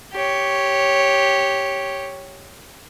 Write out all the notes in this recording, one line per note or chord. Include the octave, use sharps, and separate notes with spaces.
G4 C#5